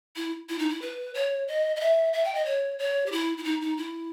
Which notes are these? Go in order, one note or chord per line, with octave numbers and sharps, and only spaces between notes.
E4
E4
D#4
E4
B4
C#5
D#5
D#5
E5
E5
G5
D#5
C#5
C#5
G4
E4
E4
D#4
D#4
E4